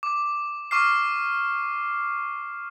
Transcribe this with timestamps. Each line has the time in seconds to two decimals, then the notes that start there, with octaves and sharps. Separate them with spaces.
0.03 D6
0.71 C#6 D6 F6 C7